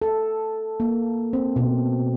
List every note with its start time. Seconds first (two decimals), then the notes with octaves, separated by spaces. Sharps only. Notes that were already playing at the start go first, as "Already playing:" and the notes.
0.02 A4
0.80 A#3
1.33 C4
1.56 B2